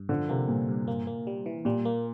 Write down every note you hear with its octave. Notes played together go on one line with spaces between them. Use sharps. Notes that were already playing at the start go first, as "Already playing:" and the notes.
Already playing: G2
D3 F3
C3 A#3
G2 A#2
G2
A#3
A#3
G3
E3
A#2 G3
A#3